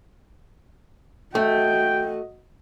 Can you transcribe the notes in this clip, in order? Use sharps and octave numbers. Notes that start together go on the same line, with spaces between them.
A3 F#4 D#5 G5